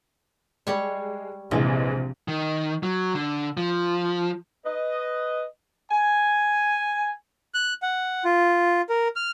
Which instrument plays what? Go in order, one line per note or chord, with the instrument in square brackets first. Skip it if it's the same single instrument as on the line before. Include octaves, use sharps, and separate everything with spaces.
[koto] G3 C#5 [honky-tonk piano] G#3
[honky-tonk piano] A#1 E3 G#3 [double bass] C3 [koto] F3
[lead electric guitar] D#3
F#3
D3
F3
[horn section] B4 D#5
G#5
[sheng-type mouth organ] F#6
F#5
F4
A#4
F6